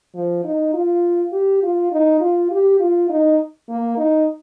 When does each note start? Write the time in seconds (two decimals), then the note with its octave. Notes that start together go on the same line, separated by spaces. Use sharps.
0.15 F3
0.44 D#4
0.73 F4
1.32 G4
1.63 F4
1.92 D#4
2.21 F4
2.51 G4
2.80 F4
3.09 D#4
3.69 A#3
3.97 D#4